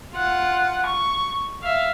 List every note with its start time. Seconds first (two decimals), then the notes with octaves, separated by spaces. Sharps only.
0.14 F4 F#5
0.86 C#6
1.63 E5 F5